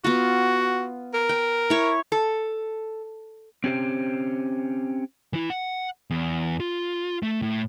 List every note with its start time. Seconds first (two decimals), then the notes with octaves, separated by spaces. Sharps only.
0.04 B3 F4 F#4
1.14 A#4
1.29 G5
1.70 E4 C#5
2.12 A4
3.64 C4 C#4 G4 C5
5.33 E3 E4
5.50 F#5
6.11 E2
6.60 F4
7.23 A3
7.42 A2